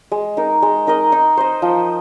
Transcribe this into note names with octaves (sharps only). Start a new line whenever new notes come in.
G#3
D#4 A#4
G#3
D#4 A#4 D#5
D#4
C5 D#5
F3